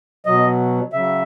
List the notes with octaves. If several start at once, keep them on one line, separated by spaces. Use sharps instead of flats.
B2 F#3 D#5
C#3 F#3 E5